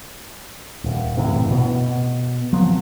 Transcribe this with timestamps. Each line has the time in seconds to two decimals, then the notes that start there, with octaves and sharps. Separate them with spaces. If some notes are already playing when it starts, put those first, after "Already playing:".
0.84 D#1
1.17 F#1 A2 C3 E3
1.51 B2 B3
2.53 F3 F#3 C4